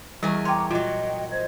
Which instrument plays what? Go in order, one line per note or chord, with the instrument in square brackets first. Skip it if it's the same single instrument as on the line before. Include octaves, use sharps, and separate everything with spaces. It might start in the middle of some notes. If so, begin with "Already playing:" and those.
[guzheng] E2 A#4 G#5 [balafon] G3 [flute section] C#6
[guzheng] C#5 [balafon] G5 C6 [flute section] A5 A#5 D6
[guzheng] A#2 F#3 [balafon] F4 [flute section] D#5 F#5 G5
[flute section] C5 D#5 G#6